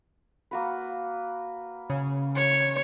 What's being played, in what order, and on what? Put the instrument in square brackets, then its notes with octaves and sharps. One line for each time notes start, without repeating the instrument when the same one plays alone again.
[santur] A#3 F#4 B4
[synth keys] C#3
[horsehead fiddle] C#5